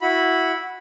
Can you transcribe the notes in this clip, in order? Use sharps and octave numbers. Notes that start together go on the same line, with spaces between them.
E4 F#4 B5